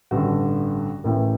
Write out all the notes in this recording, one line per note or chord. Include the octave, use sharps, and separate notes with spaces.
A1 G2 D3 F#4
A1 A2 E3 A#4